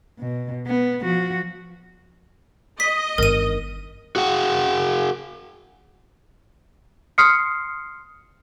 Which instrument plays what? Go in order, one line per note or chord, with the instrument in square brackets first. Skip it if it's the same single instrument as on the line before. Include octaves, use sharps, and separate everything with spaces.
[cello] B2
B3
F3 F#4
[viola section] D#5 [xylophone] B6
[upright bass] G1 D#3 [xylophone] A#4 D#7
[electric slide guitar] F#4 G#4 F#5
[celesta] C6 D#6 F6 C7 C#7